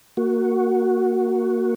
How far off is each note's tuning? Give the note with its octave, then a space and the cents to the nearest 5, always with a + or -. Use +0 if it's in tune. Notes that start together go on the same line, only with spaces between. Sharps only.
A#3 -10 F#4 +0